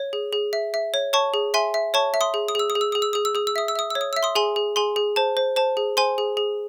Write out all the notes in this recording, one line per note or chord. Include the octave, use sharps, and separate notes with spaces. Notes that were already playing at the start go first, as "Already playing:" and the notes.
Already playing: C#5
G#4
G#4
E5
E5
C#5
C#5 A5 C#6
G#4
E5 G#5 C6
E5
C#5 A5 C#6
E5
C6 D#6
G#4
D#6
G#4 E6
D#6
G#4
E6
G#4 D#6
E6
G#4 D#6
E6
G#4 D#6
E6
E5 D#6
E6
E5 D#6
C#5 E6
D#6
E5 E6
C6 D#6
G#4 G#5 C6
G#4
G#4 G#5 C6
G#4
C5 A5
C5
C5 A5
G#4
C5 G#5 C6
G#4
G#4